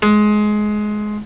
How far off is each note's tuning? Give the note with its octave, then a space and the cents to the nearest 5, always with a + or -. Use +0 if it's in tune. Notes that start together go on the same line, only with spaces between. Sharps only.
G#3 +20